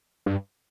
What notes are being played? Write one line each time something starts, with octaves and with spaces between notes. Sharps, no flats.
G2